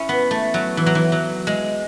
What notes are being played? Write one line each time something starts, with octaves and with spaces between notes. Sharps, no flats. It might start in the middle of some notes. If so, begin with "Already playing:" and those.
Already playing: C#4 E4
B3
A3
F#3
E3
F#3
E3
F#3
G#3